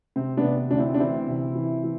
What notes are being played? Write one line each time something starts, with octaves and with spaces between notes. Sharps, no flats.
C3 C4
B3 D4
C3
D2 D4
C4 E4
D4
E3 C4 E4
C3
E3
E3